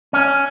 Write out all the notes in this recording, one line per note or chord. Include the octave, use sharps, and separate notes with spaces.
C#4